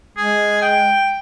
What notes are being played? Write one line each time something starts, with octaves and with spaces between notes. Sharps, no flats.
G#3 G#4
G5